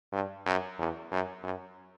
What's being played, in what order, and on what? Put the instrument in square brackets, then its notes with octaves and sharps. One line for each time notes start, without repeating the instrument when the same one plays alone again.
[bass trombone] G2
F#2
E2
F#2
F#2